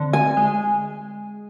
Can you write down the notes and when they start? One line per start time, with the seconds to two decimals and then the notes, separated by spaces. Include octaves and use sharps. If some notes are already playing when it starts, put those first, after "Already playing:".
Already playing: D3 C4
0.13 G#5
0.37 G#3